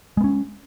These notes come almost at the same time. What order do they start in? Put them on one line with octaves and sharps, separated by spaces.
G#3 B3 C#4